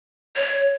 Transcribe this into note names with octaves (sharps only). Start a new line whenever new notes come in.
C#5